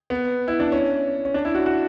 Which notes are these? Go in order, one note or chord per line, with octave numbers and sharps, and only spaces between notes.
B3
E4
D4
C#4
C#4
D4
E4
F#4
F#4